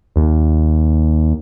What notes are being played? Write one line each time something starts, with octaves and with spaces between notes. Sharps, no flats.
D#2